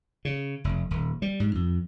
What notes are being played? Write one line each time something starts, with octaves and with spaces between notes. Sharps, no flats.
C#3
F1
D#1
G3
G#2
F2